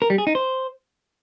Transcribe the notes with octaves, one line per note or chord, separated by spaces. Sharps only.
A#4
G3
G#4
D#4
C5